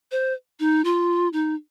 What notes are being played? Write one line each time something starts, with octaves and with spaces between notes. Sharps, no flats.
C5
D#4
F4
D#4